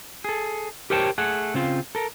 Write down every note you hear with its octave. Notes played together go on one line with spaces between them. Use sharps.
G#4 A4
G4 A#4 C5 C#5 G5 A5
A3 G#4 F#5
C#3 C4 F4
A4 A#4